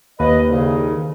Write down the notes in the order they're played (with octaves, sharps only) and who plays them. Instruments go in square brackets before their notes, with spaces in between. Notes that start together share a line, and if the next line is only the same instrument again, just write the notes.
[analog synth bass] D#2 [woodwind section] B4 D#5
[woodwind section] C2 C#3